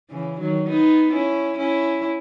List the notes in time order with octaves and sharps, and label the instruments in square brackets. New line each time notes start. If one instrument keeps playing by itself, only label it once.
[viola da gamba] C#3 E3
D#3 F#3
B3 D#4
C#4 E4
C#4 E4